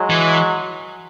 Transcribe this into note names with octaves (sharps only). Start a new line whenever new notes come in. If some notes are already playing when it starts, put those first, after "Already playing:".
Already playing: F#3 G#3
E3